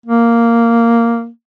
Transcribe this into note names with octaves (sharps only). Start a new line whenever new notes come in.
A#3